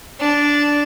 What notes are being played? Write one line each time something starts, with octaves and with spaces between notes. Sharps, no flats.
D4